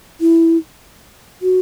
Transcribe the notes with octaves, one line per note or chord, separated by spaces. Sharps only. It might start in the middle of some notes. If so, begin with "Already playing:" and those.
E4
F#4